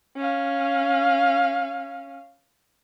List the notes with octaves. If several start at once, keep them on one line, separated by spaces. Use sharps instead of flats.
C#4 F5